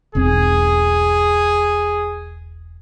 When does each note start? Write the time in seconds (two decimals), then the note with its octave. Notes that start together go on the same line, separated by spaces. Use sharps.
0.15 E1 B1 C4 G#4